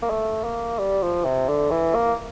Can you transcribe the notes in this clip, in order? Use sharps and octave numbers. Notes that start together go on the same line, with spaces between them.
A#3
A3
A#3
G3
F3
C3
D3
E3
A#3